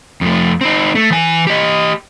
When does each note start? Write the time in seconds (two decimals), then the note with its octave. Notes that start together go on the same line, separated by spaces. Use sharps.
0.21 F2 A3
0.61 C4 D#4
0.95 A3
1.10 E3 G#5
1.47 G4 D#5